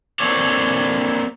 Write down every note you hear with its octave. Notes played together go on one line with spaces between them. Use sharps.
A#3 C4 A4 C#5 D5